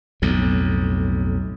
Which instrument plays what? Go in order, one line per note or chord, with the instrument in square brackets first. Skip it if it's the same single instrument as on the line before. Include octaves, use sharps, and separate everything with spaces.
[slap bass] B1 F2 A2